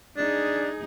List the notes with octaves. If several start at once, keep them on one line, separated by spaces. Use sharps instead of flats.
D4 D#4 G#4